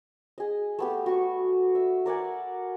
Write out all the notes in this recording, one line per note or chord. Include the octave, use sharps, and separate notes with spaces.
G#4 D#5
A3 B3 G4
F#4 C#6
E5
A#4 D5 F#5 G#5